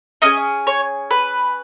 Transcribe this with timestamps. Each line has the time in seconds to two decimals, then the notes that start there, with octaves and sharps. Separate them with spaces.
0.22 C#4 D#4 G#4 D#5
0.67 C#5
1.11 B4